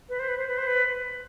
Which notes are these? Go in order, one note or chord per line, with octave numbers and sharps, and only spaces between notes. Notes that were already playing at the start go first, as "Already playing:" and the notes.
B4
C5
B4
C5
B4
C5
B4